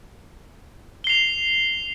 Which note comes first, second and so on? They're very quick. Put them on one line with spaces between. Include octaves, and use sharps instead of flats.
G7 C7 F7